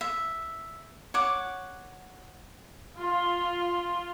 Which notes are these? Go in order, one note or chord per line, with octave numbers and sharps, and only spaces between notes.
E5
C#5 F#5 D6
F4